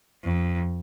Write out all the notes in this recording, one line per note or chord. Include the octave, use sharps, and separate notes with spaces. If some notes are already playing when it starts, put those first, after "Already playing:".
F2